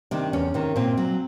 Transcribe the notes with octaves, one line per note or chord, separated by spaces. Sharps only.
C3 D#3 D4
E2 C#4
C3 D#3
A#2 C4
F#3